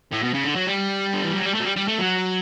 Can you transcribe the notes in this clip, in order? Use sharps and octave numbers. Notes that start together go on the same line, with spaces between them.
A2
B2
C#3
D3
F#3
G3
D3
E3
F#3
G3
A3
F#3
G3
G3
A3
F#3